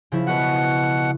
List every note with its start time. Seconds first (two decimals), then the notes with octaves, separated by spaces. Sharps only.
0.12 C#3 F3 E4
0.27 B2 F#4 B4 F#5